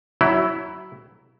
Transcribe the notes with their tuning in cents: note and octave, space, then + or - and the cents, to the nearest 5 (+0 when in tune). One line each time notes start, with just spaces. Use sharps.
F#3 +20 E4 +0